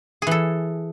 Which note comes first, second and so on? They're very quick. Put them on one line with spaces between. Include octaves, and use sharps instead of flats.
G#4 E3 A4